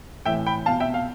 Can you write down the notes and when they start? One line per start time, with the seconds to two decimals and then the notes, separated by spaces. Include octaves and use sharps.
0.25 A2 E3 E5 G5
0.46 G5 B5
0.66 B2 F5 A5
0.80 E5 G5
0.94 F5